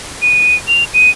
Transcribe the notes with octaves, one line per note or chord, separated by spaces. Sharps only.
D#7
F7
D#7